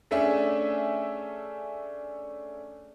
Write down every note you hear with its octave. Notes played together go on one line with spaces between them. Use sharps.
A3 C#4 D4 G#4 E5 G#5